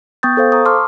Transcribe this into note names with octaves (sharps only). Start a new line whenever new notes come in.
B3 G5 C#6 D#6 G6 A6
A4 C5 F5
A#5 C#6 D#6
A5 C6 D6 D#6 F6